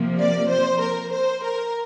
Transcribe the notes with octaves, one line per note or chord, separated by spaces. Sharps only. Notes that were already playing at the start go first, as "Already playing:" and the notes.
Already playing: C3 F3 A#3
D5
C5
A#4
C5
A#4